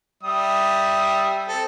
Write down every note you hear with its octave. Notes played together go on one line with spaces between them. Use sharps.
G3 E5 D#6
C4 A4